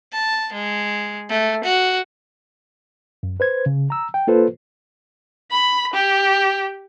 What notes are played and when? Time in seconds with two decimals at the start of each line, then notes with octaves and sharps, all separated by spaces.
0.13 A5
0.53 G#3
1.30 A3
1.64 F#4
3.23 F#2
3.40 B4 C5 G#6
3.66 C#3
3.90 A#5 E6
4.14 G5
4.27 A#3 F4 A4 B4 C5
5.51 B5
5.94 G4